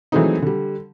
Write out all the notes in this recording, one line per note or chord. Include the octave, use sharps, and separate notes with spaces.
E3 F#3 G#3 A3 C4 D#4
D3 G3